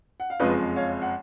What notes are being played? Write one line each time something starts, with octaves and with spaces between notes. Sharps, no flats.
F#5
F5
F#1 F2 F3 G#3 B4 D#5
C#5 F5
F#5